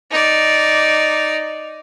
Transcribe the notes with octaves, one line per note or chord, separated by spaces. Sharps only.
D#4 D5